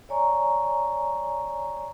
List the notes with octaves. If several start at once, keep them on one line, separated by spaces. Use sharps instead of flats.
C#5 D5 G#5 A#5 C#6